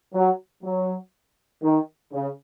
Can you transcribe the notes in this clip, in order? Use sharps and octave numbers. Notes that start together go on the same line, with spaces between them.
F#3
F#3
D#3
C#3